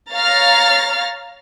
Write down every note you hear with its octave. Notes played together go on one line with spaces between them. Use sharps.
C#5 F5 A#5 F6 A6